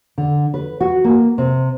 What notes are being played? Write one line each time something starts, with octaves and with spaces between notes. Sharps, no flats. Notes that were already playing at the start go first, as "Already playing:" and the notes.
D3
B4
F#4
A#3
C3